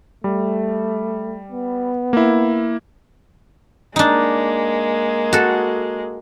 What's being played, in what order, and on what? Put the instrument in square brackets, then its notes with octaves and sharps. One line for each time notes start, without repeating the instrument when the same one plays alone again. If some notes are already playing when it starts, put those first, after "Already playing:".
[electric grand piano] G3 [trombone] A3
[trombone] B3
[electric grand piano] A#3 E4
[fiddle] G#3 A#3 [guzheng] D4 D#4
[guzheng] F#4 A4